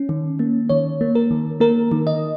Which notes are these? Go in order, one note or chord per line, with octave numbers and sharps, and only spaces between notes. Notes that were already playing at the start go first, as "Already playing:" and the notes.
Already playing: C#4
D#3
A#3
D#3 C#5
A#3
A#4
D#3
A#3 A#4
D#3
D#5